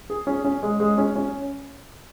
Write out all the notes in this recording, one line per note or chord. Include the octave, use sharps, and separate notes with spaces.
G#4
C#4
C#4
G#3
G#3
C#4
C#4